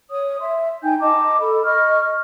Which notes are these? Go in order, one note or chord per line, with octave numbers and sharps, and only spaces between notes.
C#5 D#6
E5 C6
D#4 G5 G#5 G6
D#5 A5 A#5 D6
A4 B5
D#5 C#6 F6